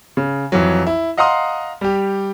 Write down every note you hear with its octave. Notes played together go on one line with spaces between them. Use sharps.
C#3
F2 E3 F#3
E4
D#5 F5 F#5 A#5 C6 D#6
G3 G4